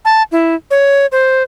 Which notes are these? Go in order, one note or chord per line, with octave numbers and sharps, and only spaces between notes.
A5
E4
C#5
C5